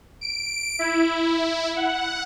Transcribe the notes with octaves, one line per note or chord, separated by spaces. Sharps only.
D7
E4
F#5